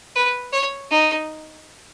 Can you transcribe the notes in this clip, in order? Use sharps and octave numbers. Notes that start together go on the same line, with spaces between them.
B4
C#5
D#4